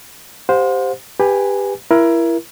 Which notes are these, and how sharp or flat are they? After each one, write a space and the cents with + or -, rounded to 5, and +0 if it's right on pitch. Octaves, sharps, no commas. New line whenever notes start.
G4 +0 C5 -5 F5 +45
G4 +20 B4 +0 G#5 +0
E4 +20 A#4 +25